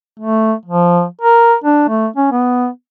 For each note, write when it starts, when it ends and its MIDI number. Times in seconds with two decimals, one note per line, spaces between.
0.20 0.53 57
0.66 1.04 53
1.21 1.55 70
1.64 1.85 62
1.89 2.07 57
2.16 2.28 61
2.32 2.68 59